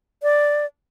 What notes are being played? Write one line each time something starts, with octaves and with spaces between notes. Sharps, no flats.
D5